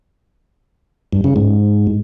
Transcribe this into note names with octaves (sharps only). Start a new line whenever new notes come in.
G2
C#3
G#2